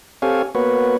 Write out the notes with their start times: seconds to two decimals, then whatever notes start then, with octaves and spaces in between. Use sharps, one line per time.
0.22 C4 G4 A4 C#5 F5 G#5
0.55 A#3 B3 F#4 B4 C#5